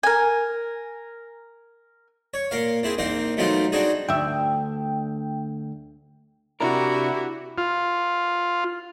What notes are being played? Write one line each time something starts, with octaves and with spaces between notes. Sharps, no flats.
A#4 G#5
C#5
A#2 A#4 F5
C4 E4 G#4
A#1 A#3 C4 D#4 C6
B2 F#3 A3 C4 D#4 F4
C4 D4 D#4 F#4 G#4
D2 E5 G5
C3 D4 E4 F#4 G4 A#4
F4